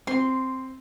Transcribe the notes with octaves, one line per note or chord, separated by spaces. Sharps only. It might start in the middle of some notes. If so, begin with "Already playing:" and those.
C4 C6